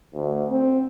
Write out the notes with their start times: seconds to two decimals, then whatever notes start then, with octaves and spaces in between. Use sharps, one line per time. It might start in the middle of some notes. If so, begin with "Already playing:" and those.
0.14 D2
0.49 C4